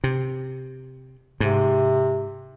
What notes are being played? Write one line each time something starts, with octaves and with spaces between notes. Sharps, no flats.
C3
G#2 C3